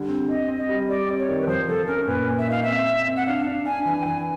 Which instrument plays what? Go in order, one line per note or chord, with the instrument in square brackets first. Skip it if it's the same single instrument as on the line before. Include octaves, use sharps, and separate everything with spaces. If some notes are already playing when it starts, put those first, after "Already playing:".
Already playing: [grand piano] D3 G3
C4
[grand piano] C4 [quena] D#5
[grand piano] C4
[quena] D#5
[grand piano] G3
[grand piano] G3 [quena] D5
[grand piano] C4
[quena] C#5
[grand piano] D#3
[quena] B4
[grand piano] F3 [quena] C5
[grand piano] F3 [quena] A4
[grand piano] C#4 [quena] A#4
[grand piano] A#2 [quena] B4
[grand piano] A#2
[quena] E5
[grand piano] D#4 [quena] F5
[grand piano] C4 [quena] E5
[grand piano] C4
C4
[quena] F#5
[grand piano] D4 [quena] F5
[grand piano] D4
[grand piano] D4 [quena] G#5
[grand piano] E3 [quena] G#5
[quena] G5
[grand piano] E3 [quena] G#5